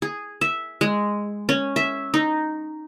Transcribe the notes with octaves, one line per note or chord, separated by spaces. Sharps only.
G#4
E5
G#3
C#4
E5
D#4